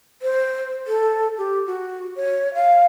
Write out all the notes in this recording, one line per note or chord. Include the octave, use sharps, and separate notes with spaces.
C5
A4
G4
F#4
C#5
F5